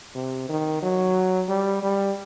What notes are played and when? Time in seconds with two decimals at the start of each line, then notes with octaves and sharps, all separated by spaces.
0.15 C3
0.49 D#3
0.83 F#3
1.49 G3
1.83 G3